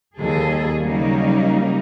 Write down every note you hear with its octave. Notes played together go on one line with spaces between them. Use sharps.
D#2 G3 G#4 A4
C#3 F#3 G3 A#3 D#4